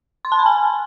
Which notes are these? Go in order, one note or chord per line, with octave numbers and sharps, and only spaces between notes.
C6
A5
B5
G#5